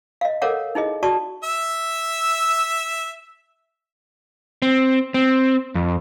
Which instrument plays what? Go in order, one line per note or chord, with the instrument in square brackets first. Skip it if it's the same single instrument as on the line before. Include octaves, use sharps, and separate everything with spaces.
[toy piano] D#5 F5
A4 A#4 C#5 F5 F#5 D6
D#4 E4 G#4 D#5
F#4 D5 A5 C#6 D#6
[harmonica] E5 E6
[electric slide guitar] C4
C4
F2